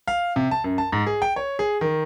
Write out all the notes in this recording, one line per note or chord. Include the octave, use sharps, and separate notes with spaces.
F5
C3
A5
F#2
A5
G#2
G#4
G5
C#5
G#4
D#3